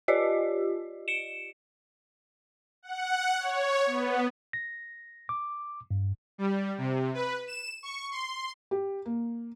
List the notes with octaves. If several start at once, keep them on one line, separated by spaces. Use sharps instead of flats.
F4 G4 D5 D#5
C#7 D7 E7
F#5
C#5
B3
A#6
D6
G2
G3
C3
B4
E7
C#6
C6
G4
A#3